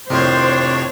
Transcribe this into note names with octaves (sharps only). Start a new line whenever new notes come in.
F2 A2 C3 D#3 D4 C5 C#5